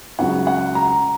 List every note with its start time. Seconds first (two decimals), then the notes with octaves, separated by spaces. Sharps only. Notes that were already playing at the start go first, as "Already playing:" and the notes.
0.19 C#2 C#3 F#3 F#5
0.47 F#5
0.75 A#5